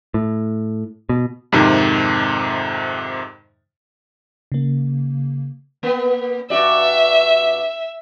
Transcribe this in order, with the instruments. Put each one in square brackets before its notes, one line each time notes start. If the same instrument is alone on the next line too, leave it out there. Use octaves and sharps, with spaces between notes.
[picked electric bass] A2
B2
[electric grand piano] F2 G#2 C3 D#3
[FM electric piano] C#3 A#3
[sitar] A#3 B3
[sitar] G2 F#4 D5 [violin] E5